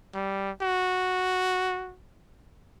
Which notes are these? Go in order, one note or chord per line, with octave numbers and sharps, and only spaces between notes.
G3
F#4